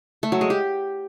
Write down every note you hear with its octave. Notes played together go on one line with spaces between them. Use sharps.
A3
F#3
G#3
G4